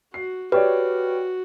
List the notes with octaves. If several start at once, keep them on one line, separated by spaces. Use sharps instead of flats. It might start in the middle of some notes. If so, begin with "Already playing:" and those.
F#4 C7
F#4 G4 B4 C#5 D5